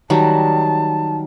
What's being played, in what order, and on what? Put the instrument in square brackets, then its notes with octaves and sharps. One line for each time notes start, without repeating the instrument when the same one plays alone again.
[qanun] D#3 F#3 G3 [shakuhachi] A5